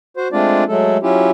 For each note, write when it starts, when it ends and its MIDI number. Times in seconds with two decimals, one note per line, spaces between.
0.17 0.28 66
0.17 0.28 72
0.32 0.64 56
0.32 0.64 57
0.32 0.64 60
0.32 0.64 62
0.32 0.64 65
0.32 0.64 74
0.68 0.98 54
0.68 0.98 56
0.68 0.98 57
0.68 0.98 69
1.03 1.31 54
1.03 1.31 61
1.03 1.31 64
1.03 1.31 65
1.03 1.31 67